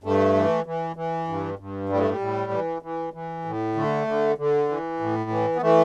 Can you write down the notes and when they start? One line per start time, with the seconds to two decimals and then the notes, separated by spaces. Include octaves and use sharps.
0.04 G2 A3
0.35 E3
0.66 E3
0.96 E3
1.28 G2
1.59 G2
1.89 A2 G3
2.00 A3
2.10 G3
2.20 A2
2.52 E3
2.82 E3
3.13 E3
3.45 A2
3.75 D3 A3
4.07 D3
4.38 D3
4.69 E3
5.00 A2
5.30 E3
5.56 B3
5.62 E3 A3